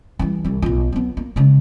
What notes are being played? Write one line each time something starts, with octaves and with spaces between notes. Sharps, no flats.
E3 G3
C2 G3
B1 F4
F#3 B3
A#3
C#3 G#3